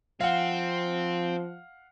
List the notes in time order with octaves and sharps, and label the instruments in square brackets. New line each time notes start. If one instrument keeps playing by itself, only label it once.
[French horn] F3 [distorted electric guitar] C4 [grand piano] F5 F#5